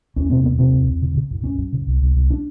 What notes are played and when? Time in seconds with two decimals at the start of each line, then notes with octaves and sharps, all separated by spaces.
0.16 E2 C#4
0.30 C3 C4
0.44 E2 B3
0.58 C3 C4
0.73 E2
0.87 E2
1.02 C#3
1.16 C#3
1.31 F#2
1.44 F#2 C#4
1.58 F#2
1.73 C#3
1.87 C2
2.02 C2
2.15 C2
2.30 D4